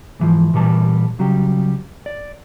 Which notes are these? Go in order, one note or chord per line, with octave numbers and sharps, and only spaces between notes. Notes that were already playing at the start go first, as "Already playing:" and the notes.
G#2 E3 F3
A#2 E3 G3 A5
C#3 F#3 G3 G4
D5